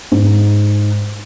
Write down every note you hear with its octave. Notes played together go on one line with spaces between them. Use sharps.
G#2